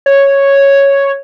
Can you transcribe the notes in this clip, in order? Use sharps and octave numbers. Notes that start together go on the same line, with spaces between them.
C#5